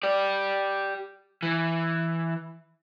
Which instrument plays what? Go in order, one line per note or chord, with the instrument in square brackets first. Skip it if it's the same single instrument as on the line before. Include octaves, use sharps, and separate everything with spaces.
[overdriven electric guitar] G4 D5
E3